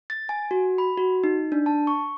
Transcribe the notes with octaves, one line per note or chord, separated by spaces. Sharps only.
A6
G#5
F#4
B5
F#4
D#4
D4
A5
C#6